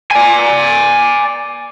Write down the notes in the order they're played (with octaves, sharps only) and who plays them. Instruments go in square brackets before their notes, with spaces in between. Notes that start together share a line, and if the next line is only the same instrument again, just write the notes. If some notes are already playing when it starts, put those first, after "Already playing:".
[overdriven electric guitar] D5 G#5